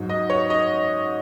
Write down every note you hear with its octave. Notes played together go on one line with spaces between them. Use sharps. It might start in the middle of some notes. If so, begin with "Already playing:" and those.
Already playing: G#2 F#3
D#5
C#5
D#5